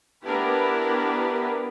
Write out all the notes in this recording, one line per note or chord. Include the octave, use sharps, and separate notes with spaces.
B3 D4 E4 G4 A#4 B4